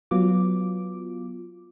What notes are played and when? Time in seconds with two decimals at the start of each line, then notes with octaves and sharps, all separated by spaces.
0.11 F#3 B3 F4 D6